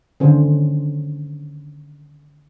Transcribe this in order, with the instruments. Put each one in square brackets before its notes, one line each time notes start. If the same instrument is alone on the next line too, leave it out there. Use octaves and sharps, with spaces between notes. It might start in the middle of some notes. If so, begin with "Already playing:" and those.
[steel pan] D3 D#3 C#4 C5